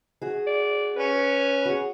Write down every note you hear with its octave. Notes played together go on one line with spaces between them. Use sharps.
F#4 G#4
D5
C#4 B4
F#4 G#4